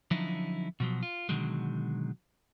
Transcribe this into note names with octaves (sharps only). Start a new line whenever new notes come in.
D3 F3 F#3 C#4 D#4 E4
B2 F3 F#3
F4
B2 D3 D#3 F#3 G#3